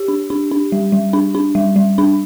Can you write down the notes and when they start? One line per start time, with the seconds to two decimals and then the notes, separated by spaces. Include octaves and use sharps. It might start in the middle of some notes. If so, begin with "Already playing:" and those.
Already playing: G4
0.08 D4
0.30 D4
0.51 D4
0.72 G3
0.92 G3
1.13 D4
1.35 D4
1.55 G3
1.76 G3
1.98 D4